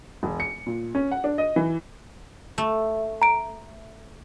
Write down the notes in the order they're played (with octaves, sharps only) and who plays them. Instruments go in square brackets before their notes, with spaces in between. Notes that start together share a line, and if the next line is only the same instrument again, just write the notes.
[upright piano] E1
C#7
A#2
C#4
F#5
D4
D#5
E3
[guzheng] A3
[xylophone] A#5 D7